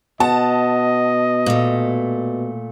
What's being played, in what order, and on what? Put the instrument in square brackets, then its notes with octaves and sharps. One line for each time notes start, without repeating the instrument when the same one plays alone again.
[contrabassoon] B2 [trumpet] D#5 [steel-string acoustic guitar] F#5 [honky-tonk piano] A5
[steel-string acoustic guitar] A#2 A3